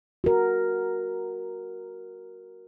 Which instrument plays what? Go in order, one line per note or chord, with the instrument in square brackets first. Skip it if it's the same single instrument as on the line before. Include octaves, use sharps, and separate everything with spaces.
[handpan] F#4 A#4